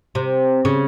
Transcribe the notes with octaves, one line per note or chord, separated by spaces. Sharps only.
C3
C#3